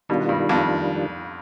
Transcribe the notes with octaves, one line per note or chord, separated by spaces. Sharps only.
B2 D#3 G3 D4 F4
G2
F2